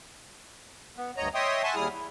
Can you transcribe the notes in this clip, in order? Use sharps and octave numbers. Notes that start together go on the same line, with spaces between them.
B3
D2 G2 C#5 D#5 A#5
C#5 D#5 E5 G5 C6 D#6
E5 F#5 G#5 A5 C6 C#6
D#2 G3 E4 G#4 D#6 F6
E4